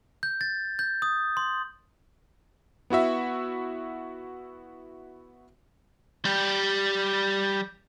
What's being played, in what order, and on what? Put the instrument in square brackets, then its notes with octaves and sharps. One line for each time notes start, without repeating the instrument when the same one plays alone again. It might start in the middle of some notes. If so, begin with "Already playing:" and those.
[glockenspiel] G6
A6
G6
D#6
C6
[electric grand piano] B3 E4 F#4 E5
[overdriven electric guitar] G3 G4